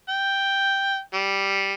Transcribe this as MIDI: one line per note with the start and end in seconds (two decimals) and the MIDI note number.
0.09 1.00 79
1.14 1.73 55